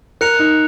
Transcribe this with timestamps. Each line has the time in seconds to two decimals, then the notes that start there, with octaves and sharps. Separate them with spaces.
0.21 A#4 F#6 C#7 F7
0.39 D#4